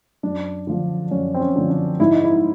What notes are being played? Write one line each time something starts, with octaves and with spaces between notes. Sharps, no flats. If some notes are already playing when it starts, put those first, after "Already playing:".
F#2 D4
D3 F3
F#2 C#4
C4
C#4
D3 F3
D4
G#2 E4
D#4
E4